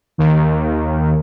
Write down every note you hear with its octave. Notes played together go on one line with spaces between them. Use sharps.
D#2 D#3